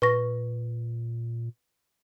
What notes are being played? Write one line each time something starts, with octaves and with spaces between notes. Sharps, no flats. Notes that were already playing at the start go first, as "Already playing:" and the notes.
A#2 B4 C#6 A#6